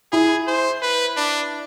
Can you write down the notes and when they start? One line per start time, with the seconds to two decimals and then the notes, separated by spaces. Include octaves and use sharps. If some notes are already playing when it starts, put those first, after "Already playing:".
0.12 E4 G#4
0.47 C5
0.82 B4
1.17 D4